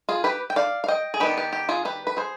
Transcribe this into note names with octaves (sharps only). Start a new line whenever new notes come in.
F4 G#4
G4 B4
G5
D5 F5
F5
D#5 G5
G#4
D#3 B3 D4 G4 B4
G4
G4
F4 G#4
G4 B4
B4
G#4 C5